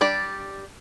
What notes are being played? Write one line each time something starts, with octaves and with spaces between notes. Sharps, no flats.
G3 D4 G4 D5